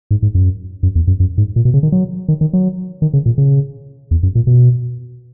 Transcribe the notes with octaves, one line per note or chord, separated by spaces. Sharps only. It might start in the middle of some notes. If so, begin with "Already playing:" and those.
G#2
G#2
F#2
F#2
E2
F#2
F#2
G#2
A#2
B2
C#3
D#3
F#3
D#3
D#3
F#3
D#3
C#3
A#2
C#3
E2
F#2
A#2
B2